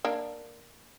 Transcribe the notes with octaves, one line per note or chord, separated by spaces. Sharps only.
A#3 D4 A#4